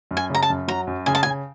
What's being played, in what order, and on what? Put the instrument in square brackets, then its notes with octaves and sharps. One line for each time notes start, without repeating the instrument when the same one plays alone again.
[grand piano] F#2
[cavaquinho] G#5
[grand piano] C#3 [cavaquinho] A#5
[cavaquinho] A5
[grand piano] F#2
[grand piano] F#3 [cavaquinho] A#5
[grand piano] F#2
[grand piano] C#3 [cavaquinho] G#5
[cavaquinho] A5
[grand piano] C#3 [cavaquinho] G#5